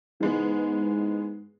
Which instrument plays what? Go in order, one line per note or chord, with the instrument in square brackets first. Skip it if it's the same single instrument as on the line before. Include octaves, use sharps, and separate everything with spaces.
[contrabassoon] G#2 [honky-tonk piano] E3 G#3 B3